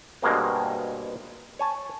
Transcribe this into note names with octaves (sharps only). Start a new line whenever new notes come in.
G2 B2 G#3 A#3 C4
C#5 G#5 A5